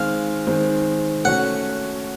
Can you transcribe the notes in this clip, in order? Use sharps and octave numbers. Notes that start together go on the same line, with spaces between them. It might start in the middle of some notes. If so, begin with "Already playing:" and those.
Already playing: D#3 G#3 C4 F5
D#3 G#3 C4
A3 C#4 F#4 F#5